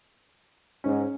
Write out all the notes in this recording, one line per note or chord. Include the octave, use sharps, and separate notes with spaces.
G#2 C#4